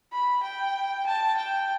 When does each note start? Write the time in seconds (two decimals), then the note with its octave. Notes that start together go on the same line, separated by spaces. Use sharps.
0.13 B5
0.43 G5
1.06 A5
1.37 G5